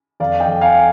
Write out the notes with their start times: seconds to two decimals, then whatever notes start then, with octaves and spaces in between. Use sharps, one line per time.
0.20 F2 D5 F5
0.40 D#5 G5
0.47 F2
0.61 F5 G#5
0.74 G#5